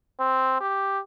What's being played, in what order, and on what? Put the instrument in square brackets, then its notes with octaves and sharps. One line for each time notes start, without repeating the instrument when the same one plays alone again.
[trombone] C4
G4